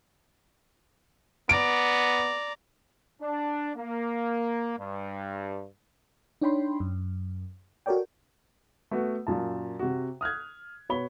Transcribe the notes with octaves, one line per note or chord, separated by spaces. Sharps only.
B3 D5 A#5 D7
D4
A#3
G2
D4 D#4 C#5 G5 B5 C6
F#2
F#4 A4 A#4 C#5 D5 G5
A3 B3 F#4
F#2 A#2 A5
C3 F#4
D#6 F6 F#6 G#6
B2 B3 C#5 B5 G7